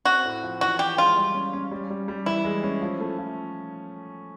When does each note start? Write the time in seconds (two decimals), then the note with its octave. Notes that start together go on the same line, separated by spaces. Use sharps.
0.05 C4 F#4
0.25 A2
0.43 F3
0.61 E3 F#4
0.79 E3 G4
0.97 G#3 F4
1.16 G3
1.34 C#4
1.53 C#4
1.72 G3
1.90 G3
2.08 G3
2.26 E3 E4
2.44 G#3
2.63 C#4
2.82 F3
3.00 A3
3.18 F3